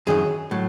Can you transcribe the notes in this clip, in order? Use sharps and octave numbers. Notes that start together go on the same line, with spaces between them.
F#2 D#3 F#3 G#4
A2 F#3